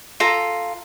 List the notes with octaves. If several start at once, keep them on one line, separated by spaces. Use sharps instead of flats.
F4 A4 A#5